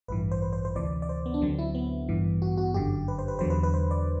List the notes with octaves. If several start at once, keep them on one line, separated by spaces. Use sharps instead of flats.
A1 G2 E3 B4
C5
B4
C5
C5
D2 C3 E3 D5
D5
C5
B3
D4
D2 D3 F#3 C4
E4
B3
A1 G2 E3
F#4
F#4
G1 F#2 D3 G4
B4
C5
B4
E2 D3 F#3 C5
B4
B4
C5
D5